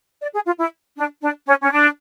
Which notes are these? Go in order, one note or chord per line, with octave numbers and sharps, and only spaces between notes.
D5
G#4
F4
E4
D4
D4
C#4
C#4
D4